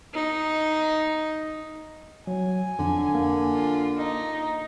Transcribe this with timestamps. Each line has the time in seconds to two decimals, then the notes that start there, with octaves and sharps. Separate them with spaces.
0.14 D#4
2.27 F#3 G#5
2.79 F2 D3
3.15 A#3
3.54 F4
3.98 D#4